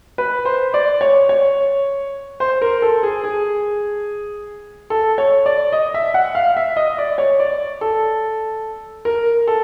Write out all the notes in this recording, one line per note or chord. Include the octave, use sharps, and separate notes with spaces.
B4
C5
D5
C#5
C#5
C5
A#4
A4
G#4
G#4
A4
C#5
D5
D#5
E5
F#5
F5
E5
D#5
D5
C#5
D5
A4
A#4
A4